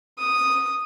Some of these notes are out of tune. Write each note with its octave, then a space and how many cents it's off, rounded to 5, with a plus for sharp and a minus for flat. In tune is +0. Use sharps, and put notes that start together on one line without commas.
D#6 -5